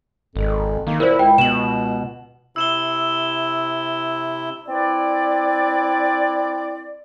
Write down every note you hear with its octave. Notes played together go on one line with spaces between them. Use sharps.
G#1 F2
D#3 A#3
A#2 E4 A#4 C5
C#2 G5
B2 E7 F#7
C3 E4 E6 E7 G7
C4 E4 B4 D5